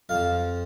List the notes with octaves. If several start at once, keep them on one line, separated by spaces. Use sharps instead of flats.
F2 F3 F5